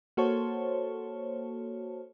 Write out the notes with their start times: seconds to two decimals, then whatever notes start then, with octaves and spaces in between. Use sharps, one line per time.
0.17 A#3 F#4 A4 C5 C#5 A5